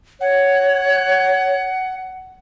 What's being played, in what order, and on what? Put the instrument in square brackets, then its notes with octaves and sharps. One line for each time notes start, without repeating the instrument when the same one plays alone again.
[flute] C#5 [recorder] F#5